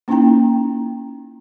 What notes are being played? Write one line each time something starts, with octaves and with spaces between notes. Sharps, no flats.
A#3 C#4 D#4 E4 G5 A#5